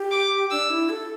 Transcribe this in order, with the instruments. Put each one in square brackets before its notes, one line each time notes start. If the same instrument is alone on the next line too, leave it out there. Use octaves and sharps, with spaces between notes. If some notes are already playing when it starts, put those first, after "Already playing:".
Already playing: [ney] G4
[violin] D6
[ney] D4 [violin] E6
[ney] E4
A4